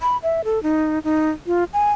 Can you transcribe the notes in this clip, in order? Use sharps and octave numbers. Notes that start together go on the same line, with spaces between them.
B5
E5
A4
D#4
D#4
F4
G#5